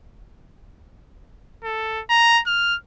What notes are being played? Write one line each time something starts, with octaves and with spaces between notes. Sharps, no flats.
A4
A#5
F6